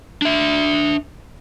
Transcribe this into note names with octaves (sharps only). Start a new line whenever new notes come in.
D4 E5